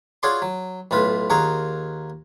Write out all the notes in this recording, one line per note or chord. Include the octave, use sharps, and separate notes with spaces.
F4 F#4 G#4 C#5 D5 C6
F#3
B1 A2 F4 B4
D#2 F4 F#4 G#4 A#4 A#5